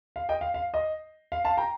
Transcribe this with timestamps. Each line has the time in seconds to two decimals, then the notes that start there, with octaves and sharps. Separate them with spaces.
0.16 F5
0.29 D#5 G5
0.41 F5
0.54 F5
0.74 D#5
1.32 F5
1.45 F5 A5
1.57 G5 A#5